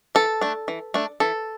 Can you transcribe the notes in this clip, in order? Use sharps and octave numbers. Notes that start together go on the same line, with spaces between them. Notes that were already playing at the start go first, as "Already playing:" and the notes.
E3 A4
A3 D4
E3
A3 D4
E3 A4